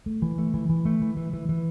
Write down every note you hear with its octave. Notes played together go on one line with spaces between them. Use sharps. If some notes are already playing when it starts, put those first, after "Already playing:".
A3
E3
A3
E3
E3
A3
E3
E3
E3
E3